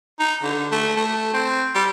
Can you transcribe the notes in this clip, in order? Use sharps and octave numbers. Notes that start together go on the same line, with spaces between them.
D#4
D3
A3
A3
C4
G3